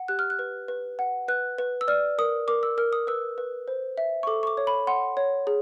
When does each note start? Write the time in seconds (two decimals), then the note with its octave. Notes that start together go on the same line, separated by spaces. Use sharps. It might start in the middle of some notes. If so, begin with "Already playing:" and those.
Already playing: F#5
0.08 G4 F#6
0.19 F6
0.30 F#6
0.39 B4
0.68 B4
0.99 F#5
1.28 B4 F#6
1.58 B4
1.81 E6
1.88 D5 F6
2.18 A#4 D#6
2.48 A#4 D6
2.63 E6
2.78 A#4 F6
2.93 D#6
3.07 B4 E6
3.38 B4
3.68 C5
3.98 E5
4.23 C#6
4.27 A4 D6
4.43 C#6
4.47 D6
4.57 C#5
4.67 B5
4.87 F#5 C6
5.17 C#5
5.47 G#4